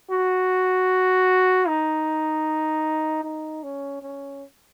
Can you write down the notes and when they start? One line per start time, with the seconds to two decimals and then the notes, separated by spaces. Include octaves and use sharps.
0.11 F#4
1.68 D#4
3.24 D#4
3.63 C#4
4.02 C#4